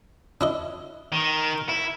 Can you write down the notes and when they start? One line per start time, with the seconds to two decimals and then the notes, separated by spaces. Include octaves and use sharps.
0.41 D4 E4 D#5
1.12 D#3
1.69 E4